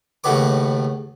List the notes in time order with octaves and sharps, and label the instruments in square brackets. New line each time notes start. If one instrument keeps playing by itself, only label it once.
[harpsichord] D#2 A2 C#3 B3 B4 D6